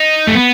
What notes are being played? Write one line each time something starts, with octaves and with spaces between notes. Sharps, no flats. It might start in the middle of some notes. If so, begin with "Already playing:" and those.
Already playing: D#4
A3
B3